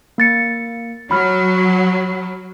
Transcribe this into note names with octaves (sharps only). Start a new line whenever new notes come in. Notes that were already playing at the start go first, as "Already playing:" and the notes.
A#3 A6 C#7
F#3 B5 F6